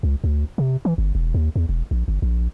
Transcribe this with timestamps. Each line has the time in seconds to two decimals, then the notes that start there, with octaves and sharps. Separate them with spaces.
0.03 C#2
0.24 D2
0.58 C3
0.85 E3
0.98 G1
1.15 E1
1.34 D#2
1.56 E2
1.69 E1
1.91 A#1
2.08 G1
2.22 A#1